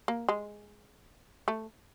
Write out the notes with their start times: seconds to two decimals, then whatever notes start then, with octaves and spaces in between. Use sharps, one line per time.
0.08 A#3
0.29 G#3
1.48 A3